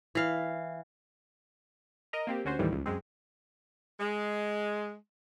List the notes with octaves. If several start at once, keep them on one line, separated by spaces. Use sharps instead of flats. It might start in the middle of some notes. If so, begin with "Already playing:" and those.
E3 F5
A#4 D#5 A#5
A#3 C4 G4
D2 C#4 F#4 C5
D#2 A2 D#3 E3 G3
C#2
F#2 G#3 C4
G#3